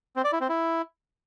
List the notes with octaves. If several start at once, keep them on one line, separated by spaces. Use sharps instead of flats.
C4
D5
E4
C4
E4